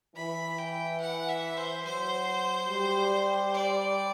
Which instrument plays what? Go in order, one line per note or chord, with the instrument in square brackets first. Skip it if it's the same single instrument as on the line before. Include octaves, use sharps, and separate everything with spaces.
[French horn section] E3 [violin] B5
[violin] G5
F#5
E5
C5
[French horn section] F#3 [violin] C5
[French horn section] G3
[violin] D5